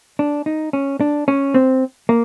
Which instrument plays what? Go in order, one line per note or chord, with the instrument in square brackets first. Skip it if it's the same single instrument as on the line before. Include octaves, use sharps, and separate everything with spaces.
[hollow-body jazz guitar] D4
D#4
C#4
D4
C#4
C4
A#3